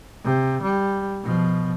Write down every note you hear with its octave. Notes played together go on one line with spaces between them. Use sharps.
C3
G3
B2 F3